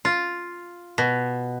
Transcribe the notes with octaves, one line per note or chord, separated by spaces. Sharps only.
F4
B2